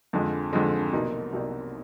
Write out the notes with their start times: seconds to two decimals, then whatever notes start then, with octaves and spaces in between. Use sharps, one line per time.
0.13 F2 D3 F3 G#3
0.53 F2 D3 F3 G#3
0.93 C2 B2 F#3 A#3 D#4
1.33 C2 B2 F#3 A#3 D#4